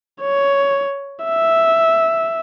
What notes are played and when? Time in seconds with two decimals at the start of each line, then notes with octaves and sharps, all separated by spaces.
0.21 C#5
1.24 E5